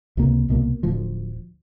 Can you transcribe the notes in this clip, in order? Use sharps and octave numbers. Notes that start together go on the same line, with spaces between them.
C#2 C3 A#3
C2 B2 A#3
D1 D2 F3